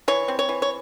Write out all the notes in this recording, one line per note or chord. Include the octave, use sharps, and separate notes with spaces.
E3 C#5
C4
C#5
E3
C#5